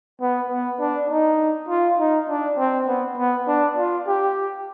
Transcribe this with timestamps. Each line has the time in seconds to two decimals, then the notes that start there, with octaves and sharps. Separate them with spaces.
0.21 B3
0.50 B3
0.80 D4
1.10 D#4
1.69 F4
1.99 D#4
2.29 D4
2.58 C4
2.88 B3
3.18 B3
3.48 D4
3.77 F4
4.07 G4